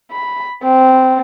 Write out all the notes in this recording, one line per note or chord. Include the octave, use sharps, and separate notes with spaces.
B5
C4